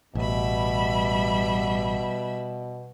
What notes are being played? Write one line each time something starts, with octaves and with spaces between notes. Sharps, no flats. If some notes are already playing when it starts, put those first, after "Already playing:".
A1 B2 G3 E5 B5